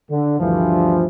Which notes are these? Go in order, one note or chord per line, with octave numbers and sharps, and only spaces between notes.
D3
D2 G2 E3 F3